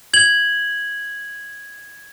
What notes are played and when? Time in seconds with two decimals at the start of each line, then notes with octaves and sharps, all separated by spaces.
0.14 G#6 F#7